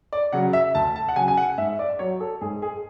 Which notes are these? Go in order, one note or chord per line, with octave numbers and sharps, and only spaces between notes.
D5
C#3 F#3 F#5
E5
D2 A5
A5
F#5
C#3 F#3 G#5
G#5
F#5
G#2 E5
D5
F#3 C#5
A4
G#2 G#4
G#4